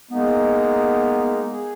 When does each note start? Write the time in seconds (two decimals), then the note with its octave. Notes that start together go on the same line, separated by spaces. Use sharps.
0.11 G#3 A#3 B3 D#4
1.51 G#4